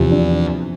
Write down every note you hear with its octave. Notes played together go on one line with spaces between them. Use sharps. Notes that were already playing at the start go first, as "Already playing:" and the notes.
Already playing: E2 C3 E3 F3
D4